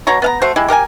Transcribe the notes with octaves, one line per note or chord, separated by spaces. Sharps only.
B2 F#4 C#5 A#5
B3 F5 A#5
A3 F#4 C5
G#3 E4 G4
G4 A#4 F5 G#5